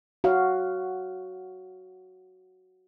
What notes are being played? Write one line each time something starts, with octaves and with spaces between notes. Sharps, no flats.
F#4 C#5 F5